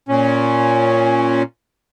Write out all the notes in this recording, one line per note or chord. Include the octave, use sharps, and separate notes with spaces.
A#2 C#4